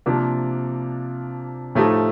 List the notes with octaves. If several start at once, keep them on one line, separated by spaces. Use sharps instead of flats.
C3 F3 A#3 D4
A2 F3 A3 D#4 G4